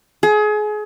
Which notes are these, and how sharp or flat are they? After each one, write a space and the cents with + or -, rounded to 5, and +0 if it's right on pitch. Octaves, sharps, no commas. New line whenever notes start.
G#4 +30